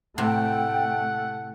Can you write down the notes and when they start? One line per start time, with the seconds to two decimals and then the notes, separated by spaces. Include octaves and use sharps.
0.18 A2 C3 A3 F#5 G5